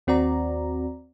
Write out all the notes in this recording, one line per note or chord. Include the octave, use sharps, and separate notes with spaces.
D#2 C4 F#4 D5 A#5